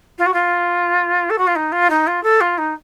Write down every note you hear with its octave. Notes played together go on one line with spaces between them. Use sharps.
F4
F#4
F4
A4
F#4
F4
D#4
F4
D#4
F4
A4
F4
D#4